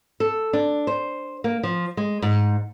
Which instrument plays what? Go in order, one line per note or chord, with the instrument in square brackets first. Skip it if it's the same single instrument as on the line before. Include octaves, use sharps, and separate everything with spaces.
[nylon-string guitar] A4
D4
C5
A#3
F3
G#3
G#2